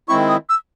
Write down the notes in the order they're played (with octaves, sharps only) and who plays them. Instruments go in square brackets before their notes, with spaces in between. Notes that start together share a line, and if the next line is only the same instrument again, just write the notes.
[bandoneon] D#3 G#3 C4 E4 [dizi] C#6
[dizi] D#6
E6